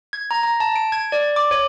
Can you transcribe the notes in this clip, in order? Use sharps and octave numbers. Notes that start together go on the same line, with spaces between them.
G#6
A#5
A#5
A5
D7
G#6
D5
D6
C#5